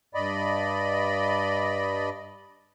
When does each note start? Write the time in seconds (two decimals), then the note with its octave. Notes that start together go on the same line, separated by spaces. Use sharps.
0.15 G2 D5 D#5 B5